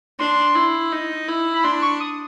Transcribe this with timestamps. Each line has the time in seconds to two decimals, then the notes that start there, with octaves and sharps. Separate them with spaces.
0.19 D4 C6
0.55 E4
0.92 D#4
1.28 E4
1.54 B5
1.64 D4 C6
1.82 C#6
2.00 D#6